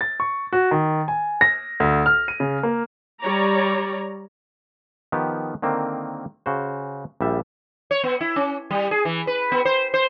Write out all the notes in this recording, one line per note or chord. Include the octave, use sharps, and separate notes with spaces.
A6
C#6
F#4
D#3
G#5
A#6
D2
F6
D#7
C#3
A#3
G3 C#5 D5 A#5
D#3 F3 B3 G4
D3 D#3 A#3 C4
C#3 F#4 C5
A#1 G3 E5
C#5
B3
E4
C#4
G3
G#4
E3
B4
B3
C5
C5